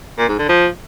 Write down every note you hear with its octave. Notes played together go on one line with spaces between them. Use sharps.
A#2
G#2
D3
F3